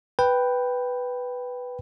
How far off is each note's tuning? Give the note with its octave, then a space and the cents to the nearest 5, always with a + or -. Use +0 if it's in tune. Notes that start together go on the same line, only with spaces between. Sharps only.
B4 +0 G5 +0